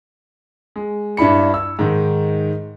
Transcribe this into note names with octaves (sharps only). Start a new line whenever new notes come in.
G#3
G2 D4 E4 B5 C#7
E6
G#2 D#3